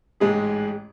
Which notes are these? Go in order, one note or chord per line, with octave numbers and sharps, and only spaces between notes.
A1 G#2 G#3 G#4